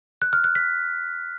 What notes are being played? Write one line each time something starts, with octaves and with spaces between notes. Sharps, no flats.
F#6
F6
F#6
B6